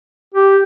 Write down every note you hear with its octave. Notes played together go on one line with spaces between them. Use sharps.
G4